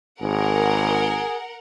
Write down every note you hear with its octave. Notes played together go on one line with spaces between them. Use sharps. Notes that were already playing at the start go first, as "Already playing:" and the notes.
G#1 G#4 A#4 F#5